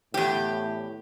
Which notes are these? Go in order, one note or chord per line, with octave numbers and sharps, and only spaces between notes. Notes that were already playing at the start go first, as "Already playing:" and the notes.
E2 A2 G4